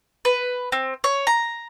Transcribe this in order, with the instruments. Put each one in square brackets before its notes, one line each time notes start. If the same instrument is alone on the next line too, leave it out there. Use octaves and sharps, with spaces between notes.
[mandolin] B4
C4
C#5
A#5